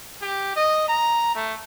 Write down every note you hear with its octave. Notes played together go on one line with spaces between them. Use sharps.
G4
D#5
A#5
A3